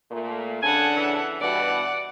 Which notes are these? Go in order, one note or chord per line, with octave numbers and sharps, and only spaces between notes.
A#2 A3 A#3
C#3 D4 A4 F#5 G#5
E3
G2 B2 E3 D5 F#5